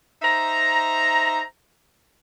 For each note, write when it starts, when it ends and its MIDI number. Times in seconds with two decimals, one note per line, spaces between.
0.22 1.42 63
0.22 1.42 72
0.22 1.42 76
0.22 1.42 82